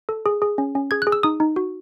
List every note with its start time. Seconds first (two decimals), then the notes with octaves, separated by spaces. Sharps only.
0.09 A4
0.26 G#4
0.42 G#4
0.58 C#4
0.75 C#4
0.91 G#4 G#6
1.02 F#6
1.07 G#4
1.12 E6
1.23 D#4 D#6
1.40 D#4
1.56 F#4